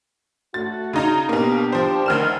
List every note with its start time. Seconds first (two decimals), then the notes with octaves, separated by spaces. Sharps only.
0.54 A3 F#4 A6
0.93 C#3 D#4 A#5
1.29 B2 A#3 D4 G4
1.72 F3 C5
2.06 D2 D#3 F6 E7